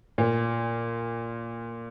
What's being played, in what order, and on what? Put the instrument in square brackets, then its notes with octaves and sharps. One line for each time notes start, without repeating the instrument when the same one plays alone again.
[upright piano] A#2